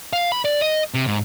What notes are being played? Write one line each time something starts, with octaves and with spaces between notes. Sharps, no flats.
F5
B5
D5
D#5
C3
G#2